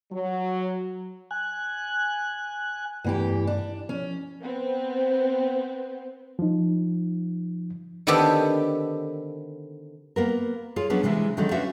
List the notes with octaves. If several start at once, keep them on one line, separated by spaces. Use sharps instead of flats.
F#3
G#5 F#6
E2 G2 E3 A3 G4
D4
F3 C#4
B3 C4
F3 D#4
D3 D#3 B3 C4 G4 A4
A#3 B3 A#4
F4 G#4 C#5
F#3 B3 C#4 D4 G#4
C3 E3 G#3 E4
D3 D#3 F#3 G#3 C#4 D#4
C#4 D4 F4 F#4 B4 E5